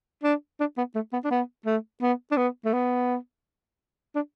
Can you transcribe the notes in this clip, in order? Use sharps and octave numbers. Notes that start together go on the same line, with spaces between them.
D4
D4
B3
A3
B3
D4
B3
A3
B3
D4
B3
A3
B3
D4